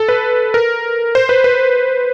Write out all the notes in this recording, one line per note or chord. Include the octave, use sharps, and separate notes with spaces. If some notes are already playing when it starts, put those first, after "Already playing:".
Already playing: A4
B4
A#4
C5
B4
B4